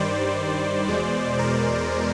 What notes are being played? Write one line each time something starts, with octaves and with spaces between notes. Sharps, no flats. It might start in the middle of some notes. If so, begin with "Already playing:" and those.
Already playing: G2 D#3 G3 C5 D5
E2 B2 G#3
A#4 C5